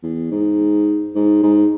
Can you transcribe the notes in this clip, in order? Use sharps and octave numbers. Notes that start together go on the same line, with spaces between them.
E2
G#2
G#2
G#2